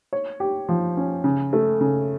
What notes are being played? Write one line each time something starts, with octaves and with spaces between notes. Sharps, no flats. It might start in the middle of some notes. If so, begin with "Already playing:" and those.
C#5
G4
F3
C#4
C#3
A3
C#3